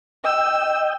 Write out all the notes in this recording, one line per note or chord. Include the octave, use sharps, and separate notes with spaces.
D#5 G5 E6